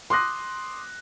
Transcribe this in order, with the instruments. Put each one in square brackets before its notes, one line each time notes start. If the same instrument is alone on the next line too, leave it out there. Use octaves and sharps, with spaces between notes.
[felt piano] C6 D6 D#6 F#6 A#6